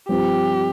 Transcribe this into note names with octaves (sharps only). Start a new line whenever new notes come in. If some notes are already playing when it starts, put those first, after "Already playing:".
G2 F3 C4 G4